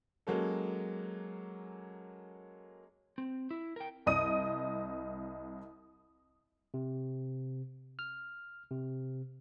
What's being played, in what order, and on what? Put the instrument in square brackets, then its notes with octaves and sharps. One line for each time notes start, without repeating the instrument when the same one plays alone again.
[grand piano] F#3 G#3 A#3 C#4 A4
[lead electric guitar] C4
E4
A#4 G5
[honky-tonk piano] C2 D#5 D#6 D#7
[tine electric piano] C3
F6
C3